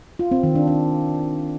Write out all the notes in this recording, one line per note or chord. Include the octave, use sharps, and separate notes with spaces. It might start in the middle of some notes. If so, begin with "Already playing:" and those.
F4
C4
D#3
D4
D4